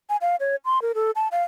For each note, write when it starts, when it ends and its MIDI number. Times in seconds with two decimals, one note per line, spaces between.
0.09 0.17 80
0.21 0.36 77
0.40 0.56 73
0.65 0.82 84
0.82 0.92 70
0.95 1.11 69
1.15 1.28 81
1.32 1.43 77